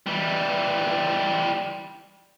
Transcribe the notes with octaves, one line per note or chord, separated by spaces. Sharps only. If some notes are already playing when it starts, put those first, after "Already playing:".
E3 G3